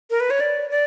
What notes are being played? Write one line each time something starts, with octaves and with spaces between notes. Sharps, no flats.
A#4
B4
C#5
D5
D5